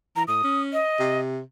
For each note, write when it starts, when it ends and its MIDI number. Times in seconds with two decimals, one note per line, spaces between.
0.16 0.24 52
0.16 0.23 82
0.28 0.41 45
0.28 0.61 87
0.44 0.79 61
0.73 1.20 75
1.00 1.40 48